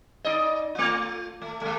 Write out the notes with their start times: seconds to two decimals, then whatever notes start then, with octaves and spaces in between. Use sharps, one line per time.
0.24 D#4 D5 D#5
0.75 A3 F4
1.42 A3
1.61 G#3 A3